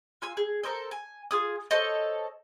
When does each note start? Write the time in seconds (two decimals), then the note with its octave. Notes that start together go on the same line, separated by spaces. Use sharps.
0.22 F4 G#5 E6
0.37 G#4
0.63 A4 A#4 C5 D#5
0.91 G#5
1.31 F4 G#4 D#6
1.71 A4 C5 C#5 D#5